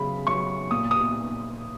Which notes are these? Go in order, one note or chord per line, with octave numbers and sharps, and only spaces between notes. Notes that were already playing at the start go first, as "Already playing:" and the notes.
Already playing: C#3 F#3 B5
F#3 C#6
A#2 D#6
D#6